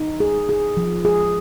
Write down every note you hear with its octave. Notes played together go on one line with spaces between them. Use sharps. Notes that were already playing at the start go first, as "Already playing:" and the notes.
Already playing: D#4
G#4
G#4
F3
G#4